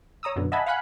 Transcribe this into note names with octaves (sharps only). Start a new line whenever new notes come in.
C#5 A#5 D#6 E6
F#2 B2 D3
D#5 E5 F#5 G#5 A5 B5
F5 F#5 G#5 B5 F#6